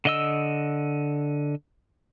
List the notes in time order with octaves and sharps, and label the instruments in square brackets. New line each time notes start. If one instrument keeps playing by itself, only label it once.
[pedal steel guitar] D3 D#5 E6